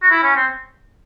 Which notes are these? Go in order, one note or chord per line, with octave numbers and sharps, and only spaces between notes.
F#4
E4
C#4
C4